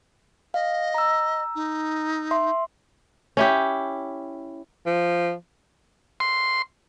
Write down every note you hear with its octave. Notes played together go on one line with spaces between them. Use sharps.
D#5 F5
A#5 E6
D#4
E5 C6
C#4 E4 G4
F3
C6